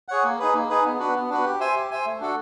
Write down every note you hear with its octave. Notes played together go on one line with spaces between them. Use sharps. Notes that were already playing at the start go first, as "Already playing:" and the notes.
G#4 C#5 F#5
A#3
D#4 G#4 B4
A#3
D#4 G#4 B4
B3
D4 F#4 B4
B3
D4 F#4 B4
G4
C5 E5 G#5
G4
C5 E5 G#5
A3
D4 F#4 A4